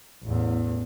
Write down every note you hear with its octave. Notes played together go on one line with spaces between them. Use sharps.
A1 E2